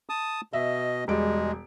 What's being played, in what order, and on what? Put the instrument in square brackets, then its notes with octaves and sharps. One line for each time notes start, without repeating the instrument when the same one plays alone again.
[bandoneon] A5 D#6
[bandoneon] B2 D#5 [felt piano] E5
[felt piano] E1 G3 D7 [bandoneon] G#3